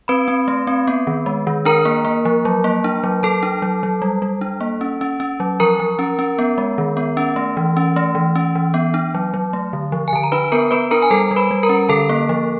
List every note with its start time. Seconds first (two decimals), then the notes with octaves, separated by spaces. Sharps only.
0.08 C4 B4 B5
0.28 C4
0.48 A3
0.67 C4
0.87 B3
1.07 D#3
1.26 G#3
1.47 D#3
1.65 D4 A#4 A#5
1.85 A#3
2.05 A#3
2.25 F3
2.45 F#3
2.64 A#3
2.84 D4
3.04 F#3
3.23 F#3 A4 A5
3.43 D4
3.62 F#3
3.83 F#3
4.02 G3
4.22 G3
4.41 D4
4.61 A#3
4.81 C#4
5.01 C#4
5.20 C#4
5.40 F#3
5.60 F3 A#4 A#5
5.80 F3
5.99 C#4
6.19 C#4
6.39 B3
6.58 G#3
6.78 D#3
6.97 B3
7.17 C#4
7.36 A3
7.57 E3
7.77 C#4
7.96 A3
8.15 E3
8.36 C#4
8.55 E3
8.74 B3
8.94 D4
9.14 F#3
9.34 F#3
9.53 A3
9.73 D3
9.92 F3
10.08 G#5
10.13 D3 A5
10.23 A#5
10.32 D4 B4 B5
10.52 B3 A#4 A#5
10.71 B3 B4 B5
10.91 D4 A#4 A#5
11.02 G#5
11.10 G3 A4 A5
11.31 G3
11.36 B4 B5
11.51 G3
11.63 A#4 A#5
11.69 C#4
11.89 D3 A4 A5
12.09 A#3
12.29 F3